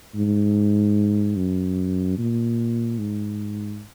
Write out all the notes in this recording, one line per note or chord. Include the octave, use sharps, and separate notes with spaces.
G#2
F#2
A#2
G#2